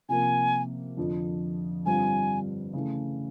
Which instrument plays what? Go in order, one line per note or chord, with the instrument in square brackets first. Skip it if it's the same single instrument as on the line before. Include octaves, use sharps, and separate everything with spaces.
[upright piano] C3 F3 A#3 [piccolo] G#5
[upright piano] F2 D3 F3
[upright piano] G2 D3 G3 C4 F4 [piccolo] G#5
[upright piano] C#3 E3 A3